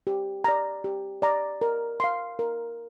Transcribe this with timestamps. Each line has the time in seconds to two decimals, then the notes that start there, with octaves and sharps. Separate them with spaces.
0.07 G4
0.44 D5 A#5
0.84 G4
1.22 D5 A#5
1.61 A#4
2.00 F5 C6
2.39 A#4